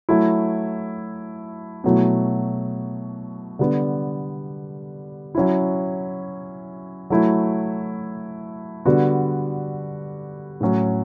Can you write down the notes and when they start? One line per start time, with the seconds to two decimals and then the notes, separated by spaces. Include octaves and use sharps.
0.09 F#3 A3 E4
1.84 B2 F#3 A3 E4
3.59 D3 G3 B3
5.35 F#3 C#4 E4
7.10 F#3 A3 E4
8.85 D3 G3 B3 F#4
10.61 A2 F#3 C#4